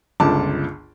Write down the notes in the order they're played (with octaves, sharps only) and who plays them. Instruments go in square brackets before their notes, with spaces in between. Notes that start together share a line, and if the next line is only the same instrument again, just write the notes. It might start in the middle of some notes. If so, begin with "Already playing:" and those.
[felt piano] G1 C#2 A5 D6